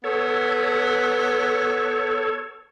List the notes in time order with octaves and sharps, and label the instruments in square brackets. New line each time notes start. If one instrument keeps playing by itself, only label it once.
[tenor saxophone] B3 [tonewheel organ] A4 C#5